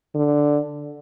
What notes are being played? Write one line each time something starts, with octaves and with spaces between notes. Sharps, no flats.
D3